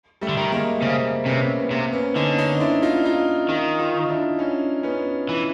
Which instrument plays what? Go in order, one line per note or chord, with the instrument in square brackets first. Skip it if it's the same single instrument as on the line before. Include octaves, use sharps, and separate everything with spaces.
[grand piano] G3 A3
[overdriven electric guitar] D3
D#3
[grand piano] G#3 A#3
[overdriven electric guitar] C#3 [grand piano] A#3 C4
[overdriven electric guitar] C3 [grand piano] B3 C#4
[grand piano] B3
[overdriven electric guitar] C3 [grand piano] A#3 C4
[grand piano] B3 C#4
[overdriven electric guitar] D3 [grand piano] C#4 D#4
[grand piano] C#4 D#4
D4 E4
D#4 F4
D#4 F4
[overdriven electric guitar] D#3 [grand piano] D#4 F4
[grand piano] D#4 F4
D4 E4
C#4 D#4
B3 C#4
[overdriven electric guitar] E3